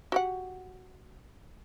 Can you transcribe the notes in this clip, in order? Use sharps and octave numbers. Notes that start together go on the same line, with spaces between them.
F#4 G4 F#5